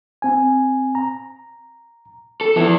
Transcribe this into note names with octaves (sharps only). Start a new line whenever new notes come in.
C4 G#5
A#5
A4
F3 B3 E4